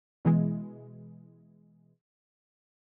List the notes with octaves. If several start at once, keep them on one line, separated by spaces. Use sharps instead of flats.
B2 E3 G#3